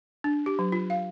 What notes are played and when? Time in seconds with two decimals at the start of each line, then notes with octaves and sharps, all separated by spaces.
0.24 D4
0.46 G4
0.59 F#3
0.72 F4
0.90 F5